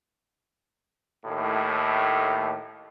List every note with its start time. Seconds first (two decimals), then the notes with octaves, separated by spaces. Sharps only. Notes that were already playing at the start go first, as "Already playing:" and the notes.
1.25 D#2 A2